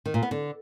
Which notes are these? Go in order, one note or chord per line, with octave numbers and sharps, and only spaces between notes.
D#3
A#2
B3
D3